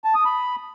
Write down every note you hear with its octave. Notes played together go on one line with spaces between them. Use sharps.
A5
D#6
B5